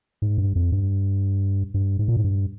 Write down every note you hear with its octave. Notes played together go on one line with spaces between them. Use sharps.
G#2
G2
F2
G2
G2
G#2
A#2
G#2
G2